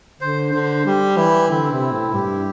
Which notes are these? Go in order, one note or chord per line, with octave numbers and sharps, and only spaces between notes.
D3 C5
D3 C5
G3 G4
E3 E4
D3 C4
C3
E4
A2
G2 G4